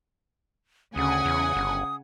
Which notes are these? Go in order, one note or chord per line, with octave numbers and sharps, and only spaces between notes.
D2 C#3 F#5 G#5 D#6
E2
G1